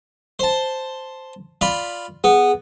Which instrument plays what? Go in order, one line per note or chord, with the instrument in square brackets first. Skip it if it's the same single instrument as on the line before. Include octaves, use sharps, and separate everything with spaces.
[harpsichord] C5 A5
F4 D5 B5
[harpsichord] B3 [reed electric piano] G#4